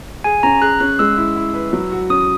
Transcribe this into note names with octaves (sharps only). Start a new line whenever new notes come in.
G#4 G#5
C#4 A#5
G#4 F#6
C#4 F#6
G#3 E6
E4
E4
B4
F#3
F#4
C#4 D#6